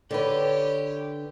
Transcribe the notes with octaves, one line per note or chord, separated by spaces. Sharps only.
D3 G4 B4 C#5